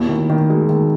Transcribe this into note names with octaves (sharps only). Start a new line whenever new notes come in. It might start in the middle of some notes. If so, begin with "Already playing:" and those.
Already playing: D#2 B2 E4
D#3
D#3
G#3
D#3